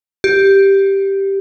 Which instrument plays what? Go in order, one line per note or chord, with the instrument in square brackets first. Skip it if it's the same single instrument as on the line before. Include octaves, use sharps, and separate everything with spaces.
[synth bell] G4